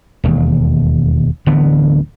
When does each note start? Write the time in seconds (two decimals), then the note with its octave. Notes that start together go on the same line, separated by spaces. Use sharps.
0.24 E1 D#2
1.46 D1 D3 E3 B3